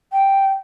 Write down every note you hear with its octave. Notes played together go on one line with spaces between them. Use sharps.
G5